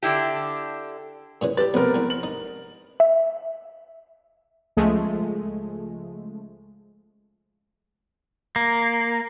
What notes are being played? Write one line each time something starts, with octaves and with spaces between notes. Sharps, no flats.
D3 D4 E4 G4
A#2 C#3 E3
G4 A4 B4 A6
F2 C3 B3 C4 A#4
E2 G#5
F#7
D#4
E5
C#2 F3 G#3 A3
A#3